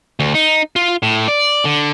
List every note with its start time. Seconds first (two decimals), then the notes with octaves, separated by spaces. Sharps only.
0.20 D2
0.35 D#4
0.76 F4
1.03 A2
1.28 D5
1.65 D3